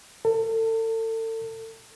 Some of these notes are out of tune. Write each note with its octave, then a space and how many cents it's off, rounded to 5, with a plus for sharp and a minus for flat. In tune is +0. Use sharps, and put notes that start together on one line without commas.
A4 +35